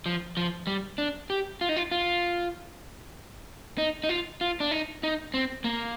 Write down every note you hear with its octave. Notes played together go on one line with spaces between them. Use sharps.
F3
F3
G3
D4
G4
F4
D#4
F4
F4
D#4
D#4
F4
F4
D4
D#4
D#4
C4
A#3